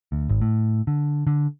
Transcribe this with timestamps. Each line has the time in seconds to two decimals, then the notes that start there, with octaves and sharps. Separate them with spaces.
0.12 D2
0.29 G#1
0.41 A2
0.87 D3
1.27 D3